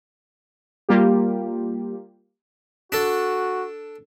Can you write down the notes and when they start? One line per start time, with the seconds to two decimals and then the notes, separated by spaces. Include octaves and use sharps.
0.89 G3 A#3 F4 G4
2.92 D4 F#4 A4